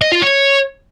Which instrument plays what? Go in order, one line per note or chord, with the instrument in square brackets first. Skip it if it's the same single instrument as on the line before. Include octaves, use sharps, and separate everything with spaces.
[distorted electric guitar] D#5
F4
C#5